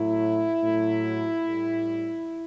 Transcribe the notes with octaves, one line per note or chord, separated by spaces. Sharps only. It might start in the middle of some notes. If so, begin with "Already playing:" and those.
Already playing: A2 F#3 E4
A2 F#3
A2 G3